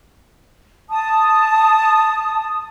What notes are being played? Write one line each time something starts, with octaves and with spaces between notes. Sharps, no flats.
A5 D#6